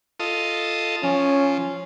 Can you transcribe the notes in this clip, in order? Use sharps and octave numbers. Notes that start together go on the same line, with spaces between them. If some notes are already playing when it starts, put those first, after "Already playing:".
F4 A4 D#5
F3 C#4